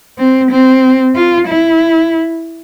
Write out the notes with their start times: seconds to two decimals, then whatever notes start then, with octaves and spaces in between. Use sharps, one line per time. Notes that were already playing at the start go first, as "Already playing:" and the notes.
0.18 C4
0.51 C4
1.15 F4
1.47 E4